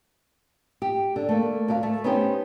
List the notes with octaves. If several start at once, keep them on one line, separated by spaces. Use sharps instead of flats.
G4
D3
A3 A#3
D2 A#4 D5 F5
A3
B3 C#4 D#4 G4 C5